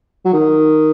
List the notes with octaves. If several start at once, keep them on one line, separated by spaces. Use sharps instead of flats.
F#3
D#3